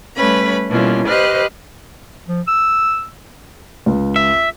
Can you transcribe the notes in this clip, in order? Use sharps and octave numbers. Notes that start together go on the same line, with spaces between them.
G3 A3 C#4 B4 B5
B2 E3 G3 A#3 C#4 F4
G4 B4 C5 D#5 F6 F#6
F3
E6
C#2
E5